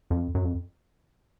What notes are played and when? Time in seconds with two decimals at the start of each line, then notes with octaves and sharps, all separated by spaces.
0.10 F2
0.35 F#2
0.44 F2